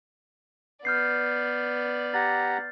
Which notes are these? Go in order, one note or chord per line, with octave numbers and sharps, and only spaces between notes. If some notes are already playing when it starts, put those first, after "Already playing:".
B3 D5 F6 G6 C7
G4 F#5 A#5 A6